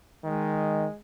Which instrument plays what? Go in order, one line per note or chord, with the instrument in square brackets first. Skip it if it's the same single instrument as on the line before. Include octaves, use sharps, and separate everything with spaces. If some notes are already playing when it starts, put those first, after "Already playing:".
[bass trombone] D#3 [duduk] G#3